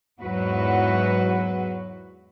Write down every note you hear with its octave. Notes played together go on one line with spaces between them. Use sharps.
E2 G#2 F#3 F#4 B4